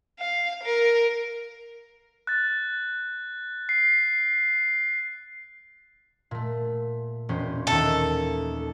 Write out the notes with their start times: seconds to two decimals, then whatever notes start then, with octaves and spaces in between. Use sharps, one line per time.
0.20 F5
0.63 A#4
2.27 F#6 A6
3.69 C7
6.31 A#2 A3
7.29 E1 C#4 C5
7.67 D#2 A4 E5